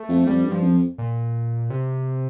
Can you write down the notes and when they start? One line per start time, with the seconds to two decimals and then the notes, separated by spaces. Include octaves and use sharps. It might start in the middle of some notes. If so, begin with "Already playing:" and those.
Already playing: A3
0.09 F2
0.27 F2 G3
0.45 G2
0.52 F3
0.63 F2
0.98 A#2
1.70 C3